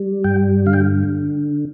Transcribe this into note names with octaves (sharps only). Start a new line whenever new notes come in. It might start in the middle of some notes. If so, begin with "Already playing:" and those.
Already playing: G3
G2 G5
D3 F5
G5